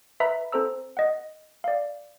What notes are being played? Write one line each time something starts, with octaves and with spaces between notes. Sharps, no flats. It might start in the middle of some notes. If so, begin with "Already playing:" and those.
B4 E5 A#5 B5 F6 B6
C4 A4 C5 A#5 E6
D#5 F#5
D5 F5